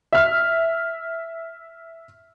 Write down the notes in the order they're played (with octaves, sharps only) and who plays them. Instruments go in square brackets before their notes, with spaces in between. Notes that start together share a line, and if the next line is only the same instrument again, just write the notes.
[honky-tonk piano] E5 F6